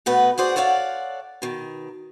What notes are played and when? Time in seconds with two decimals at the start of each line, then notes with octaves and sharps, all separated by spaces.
0.06 B2 A3 B3 B4 D#5
0.38 F#4 G#4 C5 D5
0.56 A4 C#5 D5 F5 F#5
1.42 B2 D#3